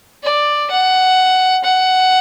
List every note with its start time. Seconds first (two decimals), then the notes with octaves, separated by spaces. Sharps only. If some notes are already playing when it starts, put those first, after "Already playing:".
0.23 D5
0.71 F#5
1.64 F#5